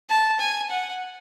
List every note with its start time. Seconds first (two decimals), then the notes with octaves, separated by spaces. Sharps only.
0.10 A5
0.40 G#5
0.70 F#5